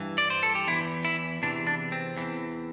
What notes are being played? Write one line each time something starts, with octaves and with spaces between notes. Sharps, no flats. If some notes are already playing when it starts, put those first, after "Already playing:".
Already playing: G2 E3
D5
C5
A4
G4
E2 E3 E4
E4
E2 C3 E3 D4
D4
C4
E2 E3